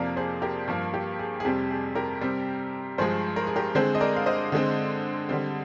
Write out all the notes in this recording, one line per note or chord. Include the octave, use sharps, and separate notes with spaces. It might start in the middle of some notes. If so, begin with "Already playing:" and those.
Already playing: F2 C3 F3 A#3 A#4 D5
G#4 C5
G4 A#4
G2 F3 A#3
G4
G#4
G#4
F2 C3 G3 C4 G4
G#4
G4 A#4
C3 G3 C4
G2 F3 G#3 G#4 C5
A#4
G#4
G4 A#4
D3 G#3 C4 G#4 C5
D#5
A#4 D5
F5
C5 D#5
D3 G#3 C4
D3 G3 C4